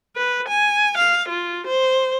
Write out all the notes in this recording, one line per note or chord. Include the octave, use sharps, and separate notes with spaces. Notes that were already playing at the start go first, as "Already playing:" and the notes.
B4
G#5
F5
F4
C5